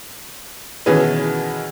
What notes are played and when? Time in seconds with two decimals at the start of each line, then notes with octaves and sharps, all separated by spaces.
0.86 B2 D#3 E3 C#4 G#4 B4